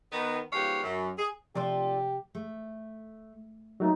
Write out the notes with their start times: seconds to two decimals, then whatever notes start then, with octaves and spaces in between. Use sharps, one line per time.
0.12 D#3 B3
0.53 G#2 F3 B3 G4 C#5 F5
0.83 F#2
1.19 G#4
1.55 C3 F3 A3 D4 F4 G4 A4
2.35 A3
3.80 F#3 A3 A#3 D#4